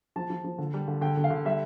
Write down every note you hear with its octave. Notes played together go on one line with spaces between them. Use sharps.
F3 A5
F3
F3
D3
G3
D3
D3 G5
D3
F5
D3
G3 E5